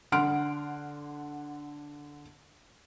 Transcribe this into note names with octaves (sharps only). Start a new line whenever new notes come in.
D3 F#5 C6 F6 D7